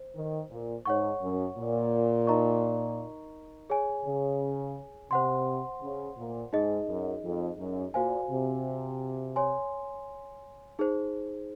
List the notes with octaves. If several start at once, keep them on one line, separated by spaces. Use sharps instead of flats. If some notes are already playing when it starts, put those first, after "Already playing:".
Already playing: C5
D#3
A#2
G#2 C#5 F#5 C#6
F#2
A#2
D#4 A#4 D#5 A#5 C#6
G#4 C#5 G#5
C#3
C3 C5 F#5 C6
C#3
A#2
G#2 D#4 G#4 D#5
F#2
F2
F#2
A#2 F#4 C5 F5 G#5
C3
C#5 G#5 C6
D#4 G#4 C5